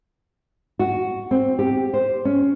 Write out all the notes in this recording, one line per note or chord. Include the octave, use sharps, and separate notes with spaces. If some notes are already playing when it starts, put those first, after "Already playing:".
F#4
C4
G4
C5
C#4